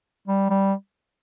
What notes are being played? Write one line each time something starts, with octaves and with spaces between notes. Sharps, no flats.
G3
G3